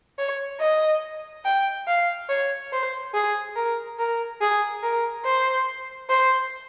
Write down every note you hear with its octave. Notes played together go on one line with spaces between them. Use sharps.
C#5
D#5
G5
F5
C#5
C5
G#4
A#4
A#4
G#4
A#4
C5
C5